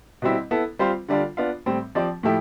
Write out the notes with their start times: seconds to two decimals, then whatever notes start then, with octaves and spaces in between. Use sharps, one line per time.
0.22 B2 G3 C4 E4
0.51 B3 E4 A4
0.79 G3 C4 F4 C5
1.08 D3 G3 D4 F4
1.37 B3 D4 F4
1.66 A2 G3 C4
1.95 F3 C4 G4 D5
2.23 A2 F3 A3 E4 G4